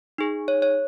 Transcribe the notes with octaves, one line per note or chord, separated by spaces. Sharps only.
D#4 G#4
C#5
C#5